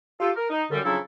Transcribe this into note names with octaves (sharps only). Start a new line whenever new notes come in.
F4 G4 A4
A#4
D#4
F#2 D3 G3
C#3 F3 F#3 D4 E4 A4